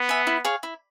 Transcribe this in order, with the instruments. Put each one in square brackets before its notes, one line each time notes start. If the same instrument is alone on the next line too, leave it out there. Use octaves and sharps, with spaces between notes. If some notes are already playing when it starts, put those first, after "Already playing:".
Already playing: [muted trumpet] B3
[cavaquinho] E5 G#5
E4
G#4 C#5 F5
E4